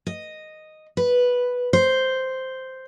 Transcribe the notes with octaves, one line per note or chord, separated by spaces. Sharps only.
D#5
B4
C5